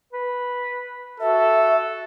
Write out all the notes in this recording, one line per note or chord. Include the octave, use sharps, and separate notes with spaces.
B4
F#4 A4 E5